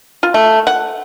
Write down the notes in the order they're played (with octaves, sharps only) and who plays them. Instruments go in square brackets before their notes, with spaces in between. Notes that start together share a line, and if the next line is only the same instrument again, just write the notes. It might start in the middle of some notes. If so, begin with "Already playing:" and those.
[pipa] F4
A3
F#5